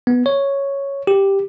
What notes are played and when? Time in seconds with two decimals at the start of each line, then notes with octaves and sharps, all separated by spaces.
0.07 B3
0.26 C#5
1.07 G4